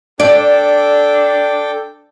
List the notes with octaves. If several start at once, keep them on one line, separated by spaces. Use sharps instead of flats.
D4 A4 D5 G5 D6